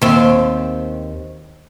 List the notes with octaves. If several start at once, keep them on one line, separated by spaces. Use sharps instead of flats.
D#2 C4